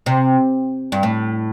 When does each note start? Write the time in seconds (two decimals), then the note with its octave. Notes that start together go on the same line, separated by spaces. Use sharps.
0.06 C3
0.92 G2
1.03 A2